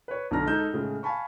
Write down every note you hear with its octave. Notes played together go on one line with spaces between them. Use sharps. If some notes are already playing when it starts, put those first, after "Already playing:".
B4 C#5
B1 D3 A#5 F6 A#6
G#2 D#4 A4 A#5 G6 E7
A2 C#3 G#3
F5 G#5 A5 B5 C#6